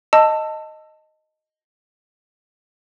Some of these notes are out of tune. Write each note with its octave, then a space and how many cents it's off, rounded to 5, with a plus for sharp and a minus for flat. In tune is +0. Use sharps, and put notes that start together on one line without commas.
D#5 +0 A5 +15 E6 +15